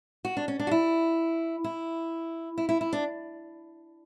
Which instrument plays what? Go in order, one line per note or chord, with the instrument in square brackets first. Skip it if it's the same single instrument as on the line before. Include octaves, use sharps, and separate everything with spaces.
[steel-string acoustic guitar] F#4
D4
C#4
D4
F#4
E4
E4
E4
E4
E4
D4